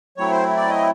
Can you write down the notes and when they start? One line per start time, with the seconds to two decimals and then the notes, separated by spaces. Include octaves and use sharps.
0.17 F#3 A3 C4 E4 C#5
0.31 C5
0.57 D5
0.70 D#5